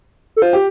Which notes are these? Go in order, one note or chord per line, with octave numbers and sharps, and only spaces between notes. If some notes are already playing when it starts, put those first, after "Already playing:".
A4
F4 C5
G4